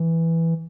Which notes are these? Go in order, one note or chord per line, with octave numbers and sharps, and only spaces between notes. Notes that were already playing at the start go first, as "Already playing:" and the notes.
Already playing: E3